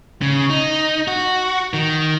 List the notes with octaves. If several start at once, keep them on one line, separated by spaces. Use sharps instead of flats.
C#3
D#4
F#4
D#3